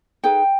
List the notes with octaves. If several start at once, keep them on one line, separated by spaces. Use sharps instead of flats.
D#4 G#4 B4 G5